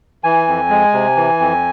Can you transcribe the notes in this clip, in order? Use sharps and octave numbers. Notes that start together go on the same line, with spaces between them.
E3 G#5
F2
G#3
C3
E3
F2